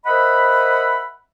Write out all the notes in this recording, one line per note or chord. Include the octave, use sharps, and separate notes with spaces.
A#4 C5 D#5 E5 F#5 B5